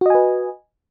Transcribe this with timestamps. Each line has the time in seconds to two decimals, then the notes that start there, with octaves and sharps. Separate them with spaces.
0.01 F#4
0.06 D#5
0.10 G#5
0.15 B4